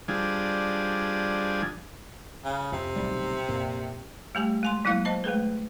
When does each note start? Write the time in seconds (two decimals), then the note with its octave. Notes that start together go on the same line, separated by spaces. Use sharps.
0.08 F3 G3 D4 G#4
2.44 C#3
2.72 F2 C3
2.96 D1 B1 G3
3.48 F2 A#2
4.35 G3 A3 G4 G#5
4.63 G#3 G#5 C6
4.85 F#3 G#3 A#3 E4 F5
5.05 C5 D#5 A5
5.24 G#3 A3 G#4 B4